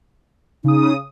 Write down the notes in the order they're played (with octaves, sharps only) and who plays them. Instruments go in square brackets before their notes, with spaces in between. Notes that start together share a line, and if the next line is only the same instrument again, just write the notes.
[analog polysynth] C#3 D#6 [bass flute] D#4